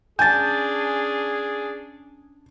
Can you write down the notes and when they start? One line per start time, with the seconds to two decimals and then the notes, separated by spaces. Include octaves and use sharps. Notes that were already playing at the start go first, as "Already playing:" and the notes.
0.19 C#4 D4 G#4 G#5 A5 G6 A6